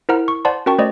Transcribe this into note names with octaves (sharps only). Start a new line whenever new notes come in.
E4 A#4 C5 F#5 A#5 F6
C#6
C5 D5 F#5 A5 C6
C#4 F#4 A#4 G5 A5 C#6
A3 C5 D5 D#5